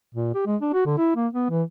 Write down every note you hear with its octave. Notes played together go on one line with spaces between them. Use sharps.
A#2
G4
G#3
D4
F#4
D3
E4
A#3
B3
E3